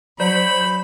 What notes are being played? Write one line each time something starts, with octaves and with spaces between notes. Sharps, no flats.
F#3 C5 D5 B5